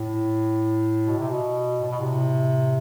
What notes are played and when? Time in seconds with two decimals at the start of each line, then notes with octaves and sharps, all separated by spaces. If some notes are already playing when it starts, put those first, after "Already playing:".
Already playing: A2
1.07 B2
1.18 C3
1.28 B2
1.81 A2
1.90 B2
2.00 A2 C3